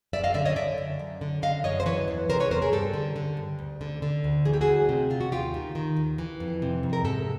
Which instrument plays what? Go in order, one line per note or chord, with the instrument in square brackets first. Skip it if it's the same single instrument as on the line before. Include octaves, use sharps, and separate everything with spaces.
[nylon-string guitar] F#2 D5 E5
D#5 F5
D3 D5 E5
C#5 D#5
D3 D5 E5
F#2
F#2
D3
D3 D#5 F5
F#2 C#5 D#5
C5
E3 B4 C#5
E2
C3 A#4 C5
B4 C#5
E2 A#4 C5
G#4 A#4
G2 G4 A4
D3
D3
G2
D2
D3
D3
D2
E3 G#4
G4
F#4 G#4
D2
C3
D2 F4
F#4
D#2 F4 G4
D#3
D#3
D#2
E3
F2
C3
F2
A#4
G#2 G4 A4